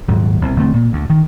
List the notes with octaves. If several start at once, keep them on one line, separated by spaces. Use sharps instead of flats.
D#1 G#2 F#3
C2 B2
E1 D3 A3 C4
A#2
D2
D#3